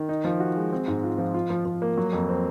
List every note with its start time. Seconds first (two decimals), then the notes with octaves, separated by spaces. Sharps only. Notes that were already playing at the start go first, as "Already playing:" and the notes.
Already playing: D#3
0.09 D#4
0.25 F3
0.40 F#4
0.56 G#3
0.72 C4
0.88 G#2
1.04 F4
1.18 F3
1.34 F4
1.50 F3
1.65 F3
1.82 A#3
1.97 F#3
2.13 F2
2.29 C4